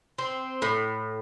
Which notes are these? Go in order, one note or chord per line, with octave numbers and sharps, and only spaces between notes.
C4
A2